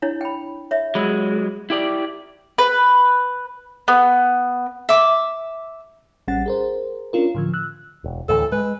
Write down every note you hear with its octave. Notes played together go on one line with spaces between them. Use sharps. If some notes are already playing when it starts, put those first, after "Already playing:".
D4 E4 C#5
G5 B5
C#5 E5
F#3 G#3 B5 E6
E4 G4 D5
B4
B3
E5 D6
A1 G3 C#4 F#5 A6
G#4 A#4 C5
C#4 D4 F4 A#4
A2 D3 F3
E6 F#6
E1
D2 A2 E3 A4
G#3 B4